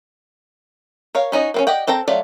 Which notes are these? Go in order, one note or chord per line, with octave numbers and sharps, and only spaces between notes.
A#4 C#5 F5
C#4 D#4 F#4 D#5
A#3 C4 C#4
G4 D5 D#5 F#5 G5
C4 A4 G5 A#5
F#3 A3 F4 D5